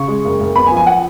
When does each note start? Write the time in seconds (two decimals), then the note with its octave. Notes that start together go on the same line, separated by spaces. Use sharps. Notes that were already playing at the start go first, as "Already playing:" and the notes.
Already playing: C#3 C#6
0.08 G#3
0.25 F#1
0.40 F#1
0.56 B3 B5
0.67 G#5
0.71 F3
0.77 G#5
0.87 F#5